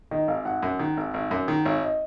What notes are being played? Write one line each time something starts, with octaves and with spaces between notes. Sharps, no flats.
D#3 D#5
G#1 F5
G#1 F#5
F#2
D#3
G#1
G#1
F#2
D#3
G#1 C#5
D#5